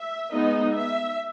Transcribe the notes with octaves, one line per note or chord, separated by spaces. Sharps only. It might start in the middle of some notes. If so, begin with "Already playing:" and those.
Already playing: E5
G#3 B3 D#4 D#5
E5